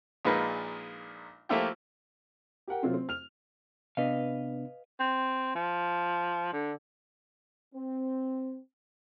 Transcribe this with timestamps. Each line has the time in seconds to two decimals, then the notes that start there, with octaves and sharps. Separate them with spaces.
0.25 A#1 A#2 G#3 D#4 A#4 B4
1.49 F3 A3 A#3 E4 F4 G4
2.67 G4 A#4 F#5 G5
2.83 C3 F#3 C4 F4
2.94 C4
3.09 F6 F7
3.97 C3 B3 D4 B4 D#5 F5
4.99 C4
5.55 F3
6.53 D3
7.75 C4